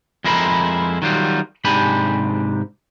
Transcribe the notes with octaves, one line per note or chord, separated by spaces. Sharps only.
F2 G#3 E4 A#4 C5 B5
D#3 F#3 G3 F4
G#2 C3 D4 G4 G#5 B5